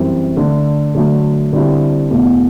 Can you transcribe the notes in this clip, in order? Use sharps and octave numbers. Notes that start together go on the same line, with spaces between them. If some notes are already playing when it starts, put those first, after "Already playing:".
Already playing: F#2 E3 G3 C4 E4
D3 A3 D4
D3 F#3 A3
D3 G3 C4 E4
E2 B2 A3 E4